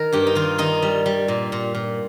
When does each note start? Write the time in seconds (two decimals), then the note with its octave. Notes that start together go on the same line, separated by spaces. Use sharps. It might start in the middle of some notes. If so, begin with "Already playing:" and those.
Already playing: D#3 A#4
0.13 G2 G4
0.27 D#4
0.35 D#3 F4
0.58 D#3 D#4
0.82 G3
1.06 G3
1.28 A#2
1.52 A#2
1.75 A#2